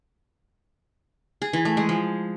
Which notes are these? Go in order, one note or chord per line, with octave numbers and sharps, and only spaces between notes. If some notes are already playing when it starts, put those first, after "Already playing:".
G#4
E3
A3
G#3
F3